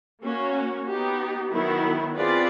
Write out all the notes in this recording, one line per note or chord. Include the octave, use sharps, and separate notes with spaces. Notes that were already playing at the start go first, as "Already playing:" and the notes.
A#3 C#4 F#4
B3 D#4 G4
D#3 F#3 B3 E4
C4 F4 G#4 B4 D5